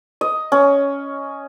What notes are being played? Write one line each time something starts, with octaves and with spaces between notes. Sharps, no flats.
D#5
C#4